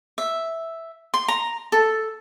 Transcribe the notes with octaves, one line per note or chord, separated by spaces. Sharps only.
E5
C6
A#5
A4